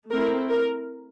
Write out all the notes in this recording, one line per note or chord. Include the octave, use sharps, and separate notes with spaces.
A3 C4 E4 A#4
A#4